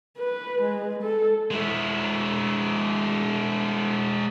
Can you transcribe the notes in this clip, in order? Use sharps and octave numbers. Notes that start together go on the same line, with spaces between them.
B4
G#3
A4
G#3 E4